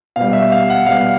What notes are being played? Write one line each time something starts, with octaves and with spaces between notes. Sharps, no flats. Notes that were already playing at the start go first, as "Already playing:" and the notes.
B2 G3 F5
E5
F5
F#5
B2 G3 F5